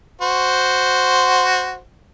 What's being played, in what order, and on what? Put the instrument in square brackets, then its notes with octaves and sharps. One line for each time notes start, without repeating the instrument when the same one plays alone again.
[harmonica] F#4 C5